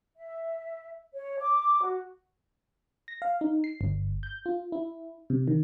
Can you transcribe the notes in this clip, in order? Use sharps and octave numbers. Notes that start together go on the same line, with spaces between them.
E5
C#5
D6
F#4
A#6
F5
D#4
C7
G1
G6
F4
E4
C3
D#3